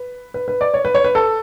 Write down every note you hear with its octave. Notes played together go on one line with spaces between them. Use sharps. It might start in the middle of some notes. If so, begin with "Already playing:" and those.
Already playing: B4
B4
B4
D5
C#5
B4
C#5
B4
A4